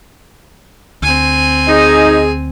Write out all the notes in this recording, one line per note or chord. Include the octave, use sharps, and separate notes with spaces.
D2 C4 G#5
D#4 G#4